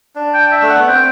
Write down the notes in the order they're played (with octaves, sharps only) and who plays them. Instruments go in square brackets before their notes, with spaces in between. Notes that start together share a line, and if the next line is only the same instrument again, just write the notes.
[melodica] D4
[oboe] G5
E5
[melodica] A3
[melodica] B3 [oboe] F#5
[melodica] C4 [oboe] G5